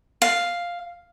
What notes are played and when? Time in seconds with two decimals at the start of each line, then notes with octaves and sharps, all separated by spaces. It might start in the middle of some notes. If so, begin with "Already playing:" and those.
0.22 F5